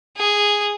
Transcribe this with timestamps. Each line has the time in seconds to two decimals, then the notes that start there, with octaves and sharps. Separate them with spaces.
0.17 G#4